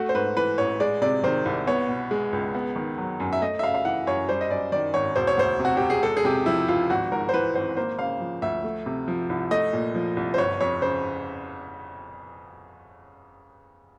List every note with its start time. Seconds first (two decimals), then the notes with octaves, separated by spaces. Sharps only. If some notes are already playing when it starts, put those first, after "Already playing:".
Already playing: A3 F#4
0.09 C5
0.14 G#2 B4
0.37 E3 B4
0.58 A1 C#5
0.80 G#3 D5
1.02 C3 D5
1.24 D#3 C5
1.45 C2
1.67 B3 C#5
1.89 B2
2.11 G#3
2.33 C#2
2.55 B3
2.76 D#3
2.98 F#3
3.20 F#2
3.33 E5
3.42 A3 D#5
3.59 E5
3.63 C#3 F5
3.74 F5
3.85 E3 F#5
4.07 F#2 C#5
4.28 G3 C5
4.41 D#5
4.50 F#2 D5
4.72 D#3 D5
4.94 G#1 C#5
5.16 E1 C5
5.27 C#5
5.37 D2 C5
5.59 C3
5.65 F#4
5.77 E1 G4
5.90 G#4
6.03 G#3 A4
6.17 G#4
6.25 C3 G4
6.46 F3 E4
6.68 C#2 F4
6.90 G#1 F#4
7.12 G#2 A#4
7.29 C5
7.34 E3 B4
7.55 G#1 C5
7.77 A#3 C5
7.99 C#3 F5
8.20 F3
8.42 D2 E5
8.64 A3
8.86 C3
9.08 F3
9.29 C2
9.51 A3 D#5
9.73 A#2
9.95 F3
10.17 C2
10.34 C5
10.38 G1 C#5
10.61 F2 C#5
10.82 C#3 C5